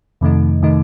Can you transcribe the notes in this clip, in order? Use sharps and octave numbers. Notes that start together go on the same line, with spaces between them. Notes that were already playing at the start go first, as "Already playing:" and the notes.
F2 C3 D#3 A3 D#4
C3 D#3 A3 D#4